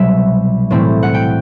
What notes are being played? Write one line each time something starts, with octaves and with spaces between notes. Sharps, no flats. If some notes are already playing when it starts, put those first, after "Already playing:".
Already playing: C2 B2 F#3 E5
A2 E3 A3 C4 E4
F#5
G5